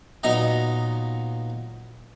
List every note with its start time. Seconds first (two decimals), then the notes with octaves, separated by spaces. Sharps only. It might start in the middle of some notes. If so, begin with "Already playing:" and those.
0.23 A#2 F#3 B3 D#4 D#5 A#5